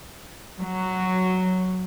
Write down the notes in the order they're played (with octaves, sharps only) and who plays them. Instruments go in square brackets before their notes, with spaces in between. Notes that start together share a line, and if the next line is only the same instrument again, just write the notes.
[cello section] F#3